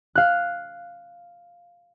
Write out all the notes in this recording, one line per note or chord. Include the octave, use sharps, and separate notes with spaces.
F5 F#6